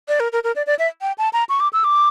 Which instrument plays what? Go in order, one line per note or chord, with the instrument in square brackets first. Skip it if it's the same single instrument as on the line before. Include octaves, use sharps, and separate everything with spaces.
[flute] D5
A#4
A#4
A#4
D5
D5
E5
G5
A5
A#5
C#6
D6
E6
D6